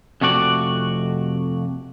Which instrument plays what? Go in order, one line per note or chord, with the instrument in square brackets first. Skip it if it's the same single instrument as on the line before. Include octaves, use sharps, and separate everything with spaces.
[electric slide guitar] F2 C3 A3 F#4 D5